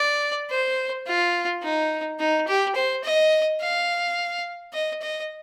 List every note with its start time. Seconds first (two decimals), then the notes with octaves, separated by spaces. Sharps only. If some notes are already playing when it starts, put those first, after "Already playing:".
Already playing: D5
0.50 C5
1.07 F4
1.62 D#4
2.20 D#4
2.47 G4
2.75 C5
3.04 D#5
3.61 F5
4.73 D#5
5.02 D#5